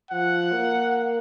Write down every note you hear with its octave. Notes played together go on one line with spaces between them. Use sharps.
F3 F#5
A#3